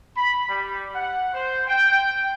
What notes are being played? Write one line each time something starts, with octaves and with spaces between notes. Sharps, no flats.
B5
G3
F#5
C5
G5